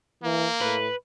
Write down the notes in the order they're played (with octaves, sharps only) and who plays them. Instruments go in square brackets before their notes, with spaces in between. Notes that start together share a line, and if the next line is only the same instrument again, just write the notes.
[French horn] E3 [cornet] A#3
[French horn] A2 [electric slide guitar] B4